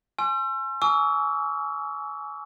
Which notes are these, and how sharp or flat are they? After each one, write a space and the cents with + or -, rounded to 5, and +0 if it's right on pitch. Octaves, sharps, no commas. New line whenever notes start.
G#5 +15 C6 +35 E6 +40
G#5 +25 C#6 +45 E6 -30